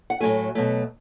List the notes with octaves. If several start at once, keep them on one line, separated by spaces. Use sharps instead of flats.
F#5
A2 F#3 A3 G#5
B2 F#3 A3